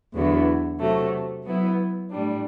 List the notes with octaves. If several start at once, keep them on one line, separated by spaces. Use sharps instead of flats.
E2 D3 F#3 B3 E4
C3 F#3 A3
F#3 B3 E4
A2 G3 D4